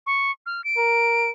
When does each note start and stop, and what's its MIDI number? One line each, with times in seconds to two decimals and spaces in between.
0.06 0.31 85
0.46 0.64 89
0.64 1.30 98
0.77 1.29 70